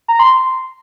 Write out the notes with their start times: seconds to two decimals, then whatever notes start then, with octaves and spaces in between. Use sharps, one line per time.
0.08 A#5
0.19 C6